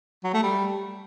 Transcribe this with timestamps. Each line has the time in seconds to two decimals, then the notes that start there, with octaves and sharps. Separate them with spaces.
0.24 F#3
0.33 A3
0.43 G3